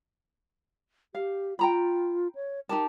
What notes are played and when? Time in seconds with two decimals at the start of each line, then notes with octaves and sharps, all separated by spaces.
1.15 G4 F5
1.59 F4 G5 A#5 B5
2.35 C#5
2.69 D#4 G4 A#4 A5